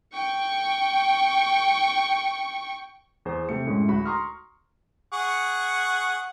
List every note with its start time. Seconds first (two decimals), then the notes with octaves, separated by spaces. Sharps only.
0.13 G5 C#6
3.25 E2 G#4 C5
3.49 C3 A3 C#7
3.66 F#2 A2 G#3
3.88 D2 F#4 B5
4.05 A#5 C6 C#6 D#6 F6
5.12 G#4 F#5 C#6